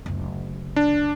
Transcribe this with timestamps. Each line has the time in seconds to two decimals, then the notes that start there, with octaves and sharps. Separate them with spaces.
0.06 F#1 D2
0.76 D4